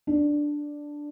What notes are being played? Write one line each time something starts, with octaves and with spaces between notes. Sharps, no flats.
D4